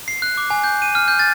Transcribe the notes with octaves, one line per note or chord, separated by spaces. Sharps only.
C7
F#6
D6
G#5
G6
D#7
F6
G6
A6